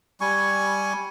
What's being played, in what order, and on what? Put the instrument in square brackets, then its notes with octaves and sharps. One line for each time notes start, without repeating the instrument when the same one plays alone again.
[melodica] G3 G#5 C#6